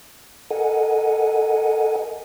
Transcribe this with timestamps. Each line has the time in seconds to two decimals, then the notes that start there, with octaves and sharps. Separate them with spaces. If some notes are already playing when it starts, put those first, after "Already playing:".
0.51 A4 A#4 D#5 F#5 G#5